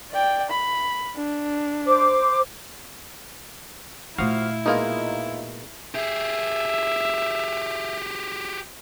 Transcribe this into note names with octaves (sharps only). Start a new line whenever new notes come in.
D5 G5
B5
D4
C5 D6
A#2 F3 A3 E4 F#4 F5
B2 G#3 A#3 D#4 F4
G4 G#4 E5